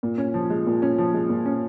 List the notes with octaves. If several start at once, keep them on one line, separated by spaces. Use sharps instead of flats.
A#2
C#4
F3
G#3
A#2
C#4
F3
G#3
A#2
C#4